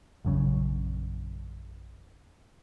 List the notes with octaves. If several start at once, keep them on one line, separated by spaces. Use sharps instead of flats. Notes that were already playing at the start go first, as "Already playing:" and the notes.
A#1 F#2 C#3